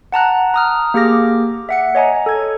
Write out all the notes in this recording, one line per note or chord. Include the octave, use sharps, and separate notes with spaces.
F#5 A5 A#5 F#6
A#5 D#6 F6
A#3 G4 G#4 D6 F6 A#6
E5 F#5 C#7
C#5 D#5 G#5 A#5
A4 G#6